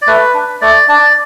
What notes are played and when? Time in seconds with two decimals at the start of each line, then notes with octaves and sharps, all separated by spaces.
0.02 D5
0.07 A3 B4
0.34 D4
0.61 A3 D5
0.88 D4 D5